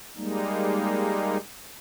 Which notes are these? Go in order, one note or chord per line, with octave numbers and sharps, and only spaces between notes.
G3 G#3 A#3 D#4